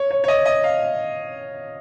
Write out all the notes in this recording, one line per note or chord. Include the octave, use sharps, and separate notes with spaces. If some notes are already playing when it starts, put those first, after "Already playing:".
Already playing: C#5
C#5
C#5
D#5
D#5
F5